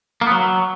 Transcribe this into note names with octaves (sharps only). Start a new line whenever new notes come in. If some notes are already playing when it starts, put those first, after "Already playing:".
A#3
B3
F#3